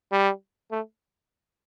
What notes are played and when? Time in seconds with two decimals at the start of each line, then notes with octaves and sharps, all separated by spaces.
0.12 G3
0.71 A3